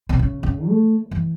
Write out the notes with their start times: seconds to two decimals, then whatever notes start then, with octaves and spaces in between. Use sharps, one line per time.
0.09 C3
0.19 C#3
0.43 C#3
0.68 A3
1.11 E3